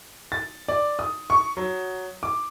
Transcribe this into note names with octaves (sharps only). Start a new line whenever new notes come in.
A6
D5
D#6
C#6
F#3
D6